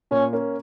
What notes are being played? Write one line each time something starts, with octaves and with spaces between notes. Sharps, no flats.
A#2 C#4
A#3 C#4